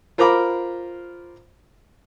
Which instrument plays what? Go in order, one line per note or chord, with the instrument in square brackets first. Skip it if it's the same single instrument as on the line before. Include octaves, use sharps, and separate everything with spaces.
[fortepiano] F4 A#4 C5 A#5 B5 D6